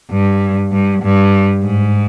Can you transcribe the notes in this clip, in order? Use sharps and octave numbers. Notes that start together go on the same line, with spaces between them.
G2
G2
G2
G#2